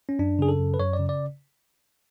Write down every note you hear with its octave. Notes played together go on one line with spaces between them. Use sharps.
C#4
F#2 D4
C#3 G#4
A4
F#2
B4
F#2 C#5
D5
C#3
D5